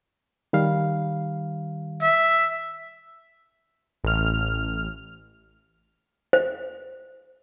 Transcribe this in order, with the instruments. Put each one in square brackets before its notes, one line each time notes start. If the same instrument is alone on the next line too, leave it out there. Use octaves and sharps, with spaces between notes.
[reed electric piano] D#3 G3 F5
[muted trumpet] E5
[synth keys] A1 F6
[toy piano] C5